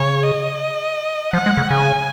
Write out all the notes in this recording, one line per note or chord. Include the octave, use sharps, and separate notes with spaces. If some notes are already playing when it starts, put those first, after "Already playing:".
Already playing: C#3 C#5
D#5
F3 F#5
G#3
C#3
C#3 G#5